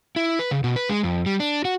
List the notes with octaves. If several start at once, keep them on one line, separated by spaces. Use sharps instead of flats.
E4
B4
C#3
B2
B4
G#3
F2
G3
D4
F#4